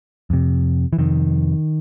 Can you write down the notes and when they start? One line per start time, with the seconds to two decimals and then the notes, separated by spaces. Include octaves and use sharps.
0.30 F2 C3
0.93 E3
0.98 F2 C3 D#3